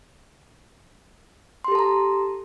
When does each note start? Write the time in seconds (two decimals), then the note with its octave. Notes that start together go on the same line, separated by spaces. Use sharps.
1.64 C6
1.68 G4
1.72 A4
1.75 A5
1.79 A#5